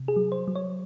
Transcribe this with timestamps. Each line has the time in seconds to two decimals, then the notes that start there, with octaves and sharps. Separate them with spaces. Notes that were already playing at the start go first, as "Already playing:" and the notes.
Already playing: C3
0.08 G#4
0.16 F#3
0.32 C5
0.48 F#3
0.55 C#5